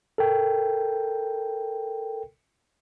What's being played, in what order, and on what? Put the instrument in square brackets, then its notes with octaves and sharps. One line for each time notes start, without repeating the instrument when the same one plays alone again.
[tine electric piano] A4 A#4 G5